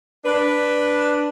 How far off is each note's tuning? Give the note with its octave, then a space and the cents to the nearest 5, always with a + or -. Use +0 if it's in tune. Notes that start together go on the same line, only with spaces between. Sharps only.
D4 +0 B4 +0